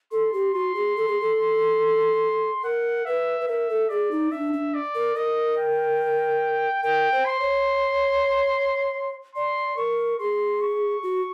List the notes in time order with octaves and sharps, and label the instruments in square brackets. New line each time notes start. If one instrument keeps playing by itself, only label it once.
[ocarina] A4 [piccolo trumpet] C6
[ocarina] G4
[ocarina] F#4 [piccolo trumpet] C6
[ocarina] G#4
A4
G#4
A4
[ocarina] A#4 [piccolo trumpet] F#5
[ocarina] B4 [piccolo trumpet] E5
[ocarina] B4
[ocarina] A#4 [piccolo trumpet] E5
[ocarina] A4
[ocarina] G#4 [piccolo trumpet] D5
[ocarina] D#4
[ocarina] D4 [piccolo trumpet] E5
[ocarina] D4
[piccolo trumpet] D5
[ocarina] A#4
[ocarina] A#4 [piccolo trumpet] D#5
[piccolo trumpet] G5
[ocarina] A#4 [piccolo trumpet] G5
[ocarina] C5
[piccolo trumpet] C6
[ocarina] C#5
[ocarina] D5 [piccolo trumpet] C6
[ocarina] A#4 [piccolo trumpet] C#6
[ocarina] G#4 [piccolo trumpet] C6
[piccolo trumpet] C#6
[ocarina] F#4